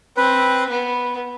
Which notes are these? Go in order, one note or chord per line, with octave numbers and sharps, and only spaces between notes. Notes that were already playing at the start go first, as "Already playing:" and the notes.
C4 B4
B3